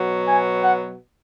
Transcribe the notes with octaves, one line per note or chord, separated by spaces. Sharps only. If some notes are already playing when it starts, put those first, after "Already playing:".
Already playing: B2 F#3 B3
G#5
F#5